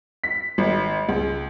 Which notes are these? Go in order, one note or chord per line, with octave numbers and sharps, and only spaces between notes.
B6
G#1
C#2